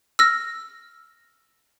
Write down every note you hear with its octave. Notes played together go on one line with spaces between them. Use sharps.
E6 F6 A#6